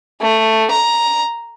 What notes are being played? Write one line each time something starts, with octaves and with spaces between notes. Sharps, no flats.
A3
A#5